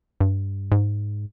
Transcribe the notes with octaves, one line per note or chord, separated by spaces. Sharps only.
G2
G#2